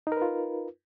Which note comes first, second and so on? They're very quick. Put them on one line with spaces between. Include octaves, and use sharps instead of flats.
D#4 A#4 B4 F4